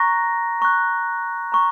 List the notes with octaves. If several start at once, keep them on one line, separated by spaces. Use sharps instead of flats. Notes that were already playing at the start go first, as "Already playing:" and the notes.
Already playing: A#5 C#6 F#6 A#6
A#5 C#6 F#6
A#5 C#6